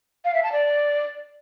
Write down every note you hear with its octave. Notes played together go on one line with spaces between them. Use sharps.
F5
E5
A5
D5